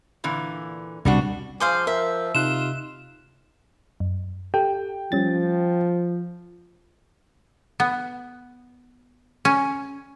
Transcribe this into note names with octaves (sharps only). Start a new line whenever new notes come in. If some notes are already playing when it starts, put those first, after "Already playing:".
A#2 D3 E3
C2 B2 G3 D4 F#4
F3 G#4 C5 F5 D6 G6
A#4 E5
C3 D#4 F4 F#6 E7
F#2
G4 A4 G5
F3 G3 C#4 A6
B3
C#4